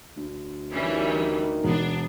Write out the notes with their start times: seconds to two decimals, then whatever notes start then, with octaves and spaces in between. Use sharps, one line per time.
0.17 D2
0.72 D#3 E3 G3 C#4
1.63 E1 B3 D4